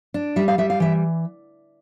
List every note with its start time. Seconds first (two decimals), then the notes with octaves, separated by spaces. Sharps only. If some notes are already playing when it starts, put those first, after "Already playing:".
0.14 D4
0.36 G3 E5
0.48 F5
0.58 G3 E5
0.70 F5
0.80 E3 E5